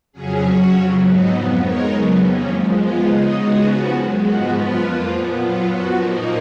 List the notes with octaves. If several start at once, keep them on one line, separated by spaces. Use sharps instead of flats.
F2 C#3 F#3 C#4 G#4
F#3 C#4 F#4 C#5
F2 C#3 F#3
G#2 F#3 B3 D#4
F2 F3 B3
G#3 D#4 A#4 C#5
C#3 F#3 B3
F2 D#3 A#3 C#4
F#2 F3 G#3
F3 G#3 B3 F4
C#3 G#3 D#4 G#4
C#3 G#3 B3 D#4 F#4
C#3 F3 B3 F#4
F#2 D#3 G#3
G#2 F3 G#3 B3 F#4
F#2 F3 B3 F4 B4
F2 F3 A#3 F4
A#2 F3 B3
F#3 B3 F4
F#2 F3 B3 F#4
A#2 F3 A#3 D#4